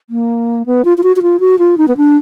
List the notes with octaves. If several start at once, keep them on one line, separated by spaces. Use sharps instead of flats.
A#3
B3
F4
F4
F#4
F#4
F4
F#4
F4
D#4
B3
D4